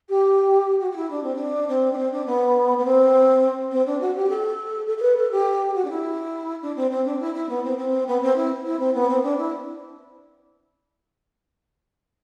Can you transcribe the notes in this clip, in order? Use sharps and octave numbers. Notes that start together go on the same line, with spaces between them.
G4
F#4
F#4
E4
D4
C4
D4
C4
D4
C4
D4
B3
B3
C4
C4
D4
F#4
G4
A4
A4
A4
B4
A4
G4
F#4
D4
E4
D4
C4
C4
D4
E4
E4
B3
C4
C4
B3
C4
E4
E4
C4
B3
C4
D4
E4